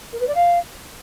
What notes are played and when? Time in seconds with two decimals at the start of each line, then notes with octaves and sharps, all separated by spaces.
0.13 A#4
0.20 B4
0.27 D5
0.35 F5